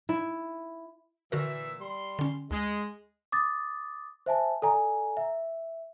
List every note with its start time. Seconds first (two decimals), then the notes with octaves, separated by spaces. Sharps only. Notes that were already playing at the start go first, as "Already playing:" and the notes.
0.09 E4
1.32 A#2 D3 E3 F#4 A#4 E5
1.81 G3 C6
2.19 D3 C#4
2.51 D2 G#3
3.32 D6 D#6 A6
4.26 C5 E5 G#5 A5
4.62 A4 D5 G#5 A#5
5.17 E5